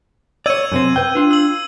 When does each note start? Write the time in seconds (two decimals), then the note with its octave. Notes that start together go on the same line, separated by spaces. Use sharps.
0.46 C#5 D5 E6 G#6 D#7
0.72 F#2 C3 C4
0.96 B4 G5
1.15 D4 F4
1.31 E6 F#7